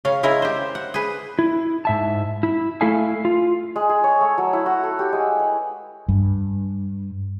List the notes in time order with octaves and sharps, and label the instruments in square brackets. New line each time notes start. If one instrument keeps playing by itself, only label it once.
[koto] C#3 C#4 F5
C#3 G#3 E4 A#4
G4 C5
F#5
G#4 B4
[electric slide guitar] E4
G#2 E5 A5
E4
A3 E4 A4 E5 F5 G#5
F4
[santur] G#3
G#4
C#5
A3
F#3
E4
F#4
A4
G4
G#3
B4
[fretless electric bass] G2